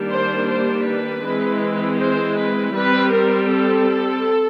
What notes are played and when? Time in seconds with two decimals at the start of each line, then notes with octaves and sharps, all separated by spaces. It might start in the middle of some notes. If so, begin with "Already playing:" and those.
Already playing: D#3 G3 A#3 D4
0.10 C5
0.48 C5
0.86 B4
1.24 E3 G#3 C4
1.99 C5
2.37 B4
2.75 G3 C4 B4
3.13 A#4
3.51 A4